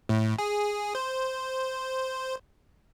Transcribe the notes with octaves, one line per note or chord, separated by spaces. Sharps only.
A2
G#4
C5